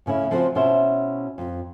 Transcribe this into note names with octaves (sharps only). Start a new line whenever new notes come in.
A2 C#3 C#4 E4
C#3 F3 C4 F#4 C5 G#5
B2 C#4 E4 C5 E5
F2